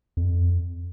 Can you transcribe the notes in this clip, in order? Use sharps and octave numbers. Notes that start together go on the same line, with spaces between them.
F2